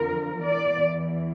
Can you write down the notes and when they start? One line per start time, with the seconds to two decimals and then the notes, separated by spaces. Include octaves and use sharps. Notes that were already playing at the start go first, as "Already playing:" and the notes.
Already playing: F2 D3 F3 A#4
0.42 E2 E3 D5